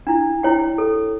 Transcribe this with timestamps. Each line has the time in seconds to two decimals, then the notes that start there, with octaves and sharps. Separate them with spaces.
0.07 D4 E4
0.43 E4 C#5 G5
0.78 A4